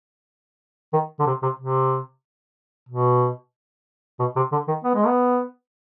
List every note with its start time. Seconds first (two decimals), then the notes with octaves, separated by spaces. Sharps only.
0.93 D#3
1.20 D3
1.27 C3
1.42 C3
1.59 C3
2.89 B2
4.20 B2
4.36 C3
4.52 D3
4.68 D#3
4.84 B3
4.95 G#3
5.07 B3